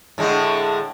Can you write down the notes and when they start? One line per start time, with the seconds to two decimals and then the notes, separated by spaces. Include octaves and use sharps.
0.18 A2 D3 G#3